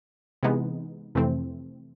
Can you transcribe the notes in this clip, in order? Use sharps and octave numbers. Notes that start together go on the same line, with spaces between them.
C3 E3 G#3 B3 D#4
F2 C3 E3 A3 C4